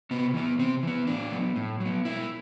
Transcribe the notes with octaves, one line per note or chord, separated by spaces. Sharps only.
C3 B3
E3 B3
C3 C4
E3 B3
A2 D4
F#3 B3
A2
F#3
B3
B2 E4